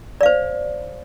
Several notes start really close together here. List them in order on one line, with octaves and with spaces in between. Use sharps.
D5 F5 C5